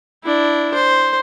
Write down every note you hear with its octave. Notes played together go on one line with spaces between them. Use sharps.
D4 E4
C5